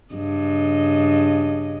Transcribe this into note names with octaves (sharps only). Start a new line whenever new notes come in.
G2 C#3 D#5